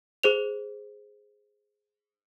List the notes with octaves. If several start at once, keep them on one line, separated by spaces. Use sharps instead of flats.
G#4 C5 F7